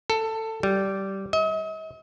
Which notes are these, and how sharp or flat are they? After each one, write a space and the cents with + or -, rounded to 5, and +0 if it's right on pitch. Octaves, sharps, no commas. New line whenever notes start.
A4 +15
G3 -15
D#5 +45